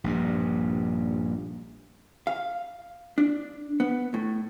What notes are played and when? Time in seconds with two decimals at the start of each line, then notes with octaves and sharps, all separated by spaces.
0.04 A#1 G2
2.27 F5
3.18 D4
3.80 B3
4.14 A2